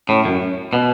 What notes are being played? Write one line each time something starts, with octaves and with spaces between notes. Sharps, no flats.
A2 C#4
F#2
B2 B3